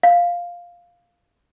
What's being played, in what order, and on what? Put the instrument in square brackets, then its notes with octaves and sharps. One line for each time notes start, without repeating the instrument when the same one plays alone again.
[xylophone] F5